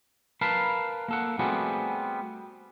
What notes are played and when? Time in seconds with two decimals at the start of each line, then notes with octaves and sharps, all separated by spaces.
0.41 A#4 B4 F5 A5 B5
1.08 A#3 A4 F#5
1.39 G3 A3 B3 C4 F#4 G#4